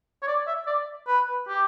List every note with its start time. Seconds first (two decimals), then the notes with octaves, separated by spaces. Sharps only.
0.22 C#5
0.27 D5
0.47 E5
0.67 D5
1.08 B4
1.48 G4